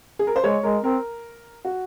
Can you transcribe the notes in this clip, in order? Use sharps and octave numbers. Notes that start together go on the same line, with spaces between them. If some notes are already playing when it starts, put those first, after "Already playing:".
G#4
A#4
C5
G#3 C#5
G#3 A#4
C4 A#4
F#4